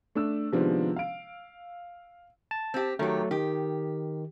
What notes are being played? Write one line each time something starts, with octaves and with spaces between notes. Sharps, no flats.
A3 D4 E6
C3 D#3 F3 G#3 B3 D4
F5 D7
A5
C4 G4
D#3 F#3 A3 G4
D#3 G4